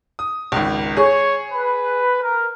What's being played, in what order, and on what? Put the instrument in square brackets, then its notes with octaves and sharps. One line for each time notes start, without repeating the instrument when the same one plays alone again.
[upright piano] D#6
G#1 C#2
[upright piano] G#4 [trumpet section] C#5
[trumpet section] B4
A#4